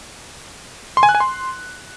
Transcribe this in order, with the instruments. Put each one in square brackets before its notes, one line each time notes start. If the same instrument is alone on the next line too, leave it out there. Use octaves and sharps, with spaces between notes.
[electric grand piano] C6
G#5
F#6
G#5
C6